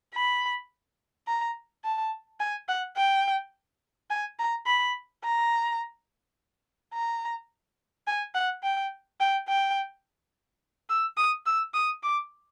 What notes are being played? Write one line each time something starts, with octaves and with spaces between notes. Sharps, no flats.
B5
A#5
A5
G#5
F#5
G5
G#5
A#5
B5
A#5
A#5
G#5
F#5
G5
G5
G5
E6
D#6
E6
D#6
D6